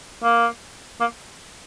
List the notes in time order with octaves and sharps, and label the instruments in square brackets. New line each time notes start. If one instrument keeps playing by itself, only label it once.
[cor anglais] A#3
A#3